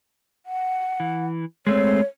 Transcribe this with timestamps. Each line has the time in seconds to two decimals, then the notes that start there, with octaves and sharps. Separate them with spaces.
0.46 F#5
1.00 E3
1.67 G#3 A3 C4 C#5